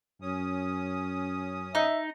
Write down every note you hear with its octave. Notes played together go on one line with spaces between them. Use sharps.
F#2 C#4 D#6
D#4 E5